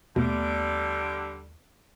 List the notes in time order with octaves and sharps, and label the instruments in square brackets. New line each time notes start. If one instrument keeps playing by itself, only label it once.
[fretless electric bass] D#2 A3 B3 [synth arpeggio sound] B2 [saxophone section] D3 G3